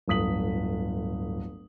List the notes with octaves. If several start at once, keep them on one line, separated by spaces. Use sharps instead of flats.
D1 G1 D#6 B6 F#7